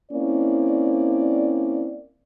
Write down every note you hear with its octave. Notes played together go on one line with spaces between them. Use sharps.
A#3 C4 C#4 E4 D5